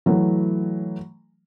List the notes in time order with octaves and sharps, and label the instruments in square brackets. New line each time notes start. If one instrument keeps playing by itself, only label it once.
[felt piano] E3 F#3 A3